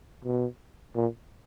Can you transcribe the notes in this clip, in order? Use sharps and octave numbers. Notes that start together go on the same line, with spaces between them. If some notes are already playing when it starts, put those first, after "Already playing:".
B2
A#2